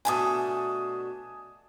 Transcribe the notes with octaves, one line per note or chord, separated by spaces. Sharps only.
B2 A3 D4 G#5 A5 D#6